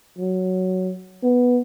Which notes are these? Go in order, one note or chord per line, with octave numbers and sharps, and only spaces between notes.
F#3
B3